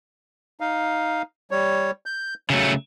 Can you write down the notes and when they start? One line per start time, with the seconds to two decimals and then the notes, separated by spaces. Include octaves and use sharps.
0.60 D#4 F5
1.51 G3 C#5
2.06 G6
2.50 C#3 F#3 A3